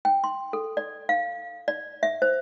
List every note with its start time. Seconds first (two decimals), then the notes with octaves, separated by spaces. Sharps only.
0.05 G5
0.24 C6
0.53 A4
0.77 D5
1.09 F5
1.68 D5
2.03 E5
2.22 C5